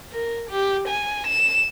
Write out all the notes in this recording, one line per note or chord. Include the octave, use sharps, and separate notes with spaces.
A#4
G4
G#5
E7